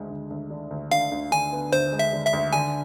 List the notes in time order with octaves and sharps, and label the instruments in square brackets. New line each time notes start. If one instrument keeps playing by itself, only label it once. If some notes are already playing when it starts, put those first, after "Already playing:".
Already playing: [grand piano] D2 D3 G#3
D2
D2
D3
D2
[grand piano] D3 [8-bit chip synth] F5
[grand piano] D2
[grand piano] D3 [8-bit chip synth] G#5
[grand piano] B3
[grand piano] D2 [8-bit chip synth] C5
[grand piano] G#3
[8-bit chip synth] E5
[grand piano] D3
[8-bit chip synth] E5
[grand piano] D2
[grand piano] D3 [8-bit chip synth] G#5